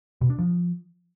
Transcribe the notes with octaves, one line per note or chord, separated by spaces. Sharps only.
B2
D4
F3